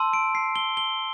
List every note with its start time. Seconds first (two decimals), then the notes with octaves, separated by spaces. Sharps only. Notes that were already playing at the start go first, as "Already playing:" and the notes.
Already playing: A5 C6 E6
0.13 D7
0.35 C7
0.56 G7
0.77 G7